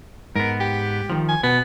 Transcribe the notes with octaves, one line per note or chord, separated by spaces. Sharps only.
G#2 B3 A#4
G4
D#3 F3
G#5
B2 B3